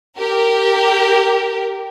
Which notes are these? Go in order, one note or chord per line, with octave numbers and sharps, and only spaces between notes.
G4 A#4